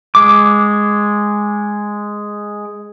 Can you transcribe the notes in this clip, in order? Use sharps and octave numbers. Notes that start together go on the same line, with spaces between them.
G#3 D6